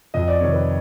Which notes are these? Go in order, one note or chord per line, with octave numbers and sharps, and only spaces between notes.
F2 D#5
D5
C3 D#3 C#5
B4